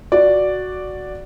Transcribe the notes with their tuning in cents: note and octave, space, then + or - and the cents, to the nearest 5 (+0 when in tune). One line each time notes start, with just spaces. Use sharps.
F#4 +0 D5 +0